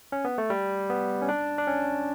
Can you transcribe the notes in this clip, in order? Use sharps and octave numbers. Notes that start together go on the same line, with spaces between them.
C#4
B3
A3
G3
B3
C#4
D4
D4
C#4